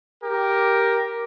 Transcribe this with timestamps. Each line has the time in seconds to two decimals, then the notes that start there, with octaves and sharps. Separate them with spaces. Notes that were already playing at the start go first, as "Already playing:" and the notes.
0.21 G4 A#4